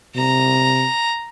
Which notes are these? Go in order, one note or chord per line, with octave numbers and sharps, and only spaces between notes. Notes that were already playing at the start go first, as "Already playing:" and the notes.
C3 A#5